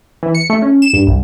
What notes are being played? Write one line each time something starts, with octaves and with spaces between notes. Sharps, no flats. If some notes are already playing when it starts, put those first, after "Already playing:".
E3
C#7
A3
C#4
E7
G2
C2